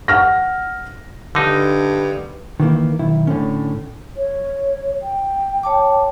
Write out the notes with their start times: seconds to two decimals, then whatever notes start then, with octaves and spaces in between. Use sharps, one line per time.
0.08 F#5 F6 A#6
1.35 G2 D3 D#4
2.60 D#3 E3 A#3
2.99 B1 D#3 E4
3.27 A2 D3 C#4
4.17 C#5
5.03 G5
5.63 C#5 A5 D6